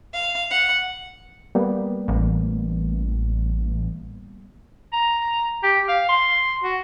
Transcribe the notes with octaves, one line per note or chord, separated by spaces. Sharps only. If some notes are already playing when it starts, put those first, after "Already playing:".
F5
F#5
G3 A#3 B3
A1
A#5
G4
F5
C6
F#4